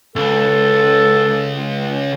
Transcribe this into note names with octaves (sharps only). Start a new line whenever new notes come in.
C#2 A4